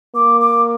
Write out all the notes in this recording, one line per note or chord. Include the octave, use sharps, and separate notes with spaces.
A#3 D6
D6